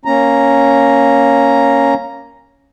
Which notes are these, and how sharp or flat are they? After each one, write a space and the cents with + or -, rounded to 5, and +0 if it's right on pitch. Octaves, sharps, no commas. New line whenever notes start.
A#3 +0 C#4 +0 A#5 +0